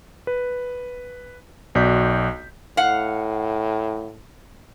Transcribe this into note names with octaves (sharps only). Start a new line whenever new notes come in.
B4
B1 F#4 D5 G6 B6
A2 F5 F#5